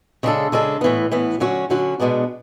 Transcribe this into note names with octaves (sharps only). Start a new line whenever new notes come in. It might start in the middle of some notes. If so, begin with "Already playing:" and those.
C#3 G#3 D4 A4
C#3 G#3 D4 A4
A2 E3 B3
A2 E3 B3
D3 F#3 C#4 F#4
D3 F#3 C#4 F#4
B2 G#3 B3 D4